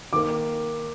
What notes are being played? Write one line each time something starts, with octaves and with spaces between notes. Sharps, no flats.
D#3 A#3 D6